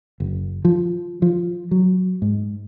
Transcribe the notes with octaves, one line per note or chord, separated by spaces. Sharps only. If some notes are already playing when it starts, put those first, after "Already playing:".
F#1
F3
F3
F#3
G#2